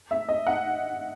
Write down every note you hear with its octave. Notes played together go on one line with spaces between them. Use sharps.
E5
D#5
F#5